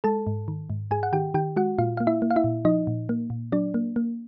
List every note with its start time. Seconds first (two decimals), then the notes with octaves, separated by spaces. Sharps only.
0.04 G#3 A4 A5
0.27 G#2
0.48 D#3
0.70 G#2
0.91 G#2 G#4 G#5
1.03 F#5
1.13 D#3 G4 G5
1.34 D#3 G4 G5
1.56 G#3 F#4 F#5
1.78 A#2 F4 F5
1.97 A#3 F5
2.07 E4 E5
2.22 A#3
2.31 F5
2.36 E4 E5
2.44 A#2
2.65 F3 D#4 D#5
2.87 A#2
3.09 A#3
3.30 A#2
3.52 F#3 D4 D5
3.74 A#3
3.96 A#3